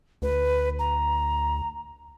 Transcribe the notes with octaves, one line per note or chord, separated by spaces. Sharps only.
D2 B4
A#5